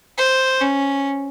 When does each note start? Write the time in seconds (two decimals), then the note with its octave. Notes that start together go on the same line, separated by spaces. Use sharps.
0.18 C5
0.61 C#4